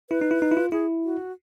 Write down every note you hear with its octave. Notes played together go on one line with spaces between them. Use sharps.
E4 B4
D#4
E4
D#4
E4
F4
E4 G#4
F#4